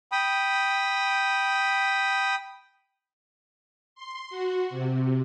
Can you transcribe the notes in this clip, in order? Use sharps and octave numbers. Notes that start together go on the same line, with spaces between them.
G5 B5 D#6
C6
F#4
C3